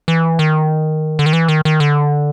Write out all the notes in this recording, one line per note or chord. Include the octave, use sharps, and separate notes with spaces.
E3
D#3
D3
D#3
E3
D#3
D#3
D3